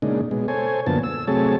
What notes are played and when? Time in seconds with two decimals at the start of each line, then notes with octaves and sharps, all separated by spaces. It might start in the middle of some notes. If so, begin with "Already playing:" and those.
0.02 A#2 C#3 G#3 D4 D#4
0.31 B2 G#3
0.48 A4 C5 C#5 G#5
0.86 F#2 A#2 D3 F3 B3 A5
1.04 E6
1.28 C3 F#3 A3 G#4 C#5 A5